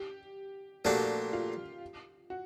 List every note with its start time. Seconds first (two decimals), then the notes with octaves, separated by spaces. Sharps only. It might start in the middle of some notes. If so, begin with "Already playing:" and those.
Already playing: G4
0.85 A#2 F3 A3 D4 F#4 G4
1.33 F4
2.30 F#4